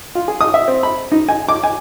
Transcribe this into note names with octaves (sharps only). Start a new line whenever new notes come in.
F4
G#4
D#6
E5
C4
B5
D#4
G#5
D6
G#5